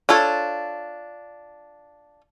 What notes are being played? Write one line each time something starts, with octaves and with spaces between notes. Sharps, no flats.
D4 F4 A4 C#5